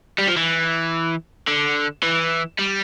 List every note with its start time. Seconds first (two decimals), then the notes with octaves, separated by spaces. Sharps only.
0.18 G3
0.28 F3
0.37 E3
1.48 D3
2.03 E3
2.58 G3